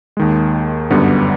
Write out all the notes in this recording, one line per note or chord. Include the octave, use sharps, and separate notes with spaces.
D#2 D#3 G#3
G1 F#2 D3 G3 B3